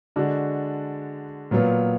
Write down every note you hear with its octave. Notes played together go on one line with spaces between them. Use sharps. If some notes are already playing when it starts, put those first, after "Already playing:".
D3 G#3 D4 F#4
A#2 F#3 B3 F4